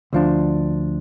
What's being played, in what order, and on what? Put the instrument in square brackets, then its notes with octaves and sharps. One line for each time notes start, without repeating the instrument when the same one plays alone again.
[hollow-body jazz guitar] D2 F3 D4